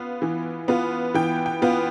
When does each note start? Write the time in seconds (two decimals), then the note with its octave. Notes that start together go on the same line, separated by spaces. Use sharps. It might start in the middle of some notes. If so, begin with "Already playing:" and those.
Already playing: B3 F4 F5
0.22 E3
0.68 B3 F4
1.14 E3 G5
1.46 G5
1.62 B3 F4